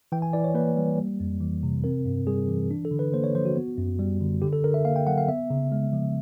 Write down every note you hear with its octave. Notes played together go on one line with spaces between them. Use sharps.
E3 G5
G#5
E3 D5
C#5
A#3 B4
G3
G3
F2
E3
C3
C4 A#4
G2
G3 G#4
E3
D4
A4
D3
B4
A#3 C5
C#5
F3 C5
F#4
B3
F#2
G3
D3
D3 G4
A4
D3 A#4
E5
A#3 F5
G5
F#3 F#5
F5
B3 E5
C#3
G#3
F3